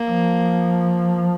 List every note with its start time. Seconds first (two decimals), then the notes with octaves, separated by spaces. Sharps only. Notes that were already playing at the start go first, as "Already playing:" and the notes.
Already playing: A#3
0.10 F3